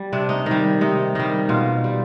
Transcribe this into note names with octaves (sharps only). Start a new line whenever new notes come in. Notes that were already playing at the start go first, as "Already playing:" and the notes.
Already playing: G3
C3 D4
D#4
D#3
G3
C3 D#4
D#3 G3 D#4
B2 F4
G3